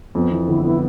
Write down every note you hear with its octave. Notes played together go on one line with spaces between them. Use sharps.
F2 B3
E3
G1 E4
B3 E4